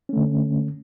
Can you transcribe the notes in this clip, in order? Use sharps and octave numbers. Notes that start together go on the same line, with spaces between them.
D3 A3 C#4